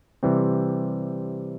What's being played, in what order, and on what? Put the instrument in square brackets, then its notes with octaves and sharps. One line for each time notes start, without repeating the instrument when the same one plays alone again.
[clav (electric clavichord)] C3 E3 G3 C4